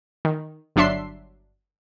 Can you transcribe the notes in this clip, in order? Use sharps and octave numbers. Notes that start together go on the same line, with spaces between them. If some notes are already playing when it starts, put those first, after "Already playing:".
D#3
G1 F#3 D4 E5 C6 C7